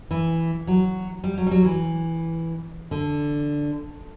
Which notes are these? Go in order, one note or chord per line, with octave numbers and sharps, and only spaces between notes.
E3
F#3
G3
F#3
G3
F#3
E3
D3